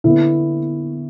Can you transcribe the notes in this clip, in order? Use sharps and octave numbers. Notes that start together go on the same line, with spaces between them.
D3 B3 E4